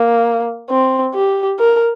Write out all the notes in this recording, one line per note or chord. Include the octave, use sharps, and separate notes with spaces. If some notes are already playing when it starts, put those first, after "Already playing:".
Already playing: A#3
C4
G4
A#4